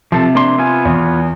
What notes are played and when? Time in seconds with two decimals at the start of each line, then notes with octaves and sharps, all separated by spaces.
0.12 C3 F3 A4
0.35 A#3 D4 C6
0.58 B3 F4 G#5
0.85 E2